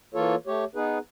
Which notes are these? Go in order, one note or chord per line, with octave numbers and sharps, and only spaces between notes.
E3 A#3 F4 A4 C#5
A3 G4 C#5
B3 D#4 G#4 B4